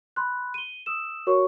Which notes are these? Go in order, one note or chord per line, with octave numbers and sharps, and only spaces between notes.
B5 C6 F#6
D#7 G7
D#6 E6 E7
F#4 A#4 C#5 C#6